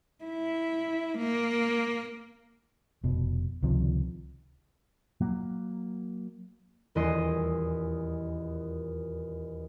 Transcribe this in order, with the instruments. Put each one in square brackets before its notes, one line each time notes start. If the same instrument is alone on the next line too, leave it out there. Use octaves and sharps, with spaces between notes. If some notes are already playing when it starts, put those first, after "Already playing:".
[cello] E4
A#3
[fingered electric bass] F1 B2
C#2 C3 D#3 F3
[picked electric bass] F#3 A#3
[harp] D#1 E2 E4 D#5 C6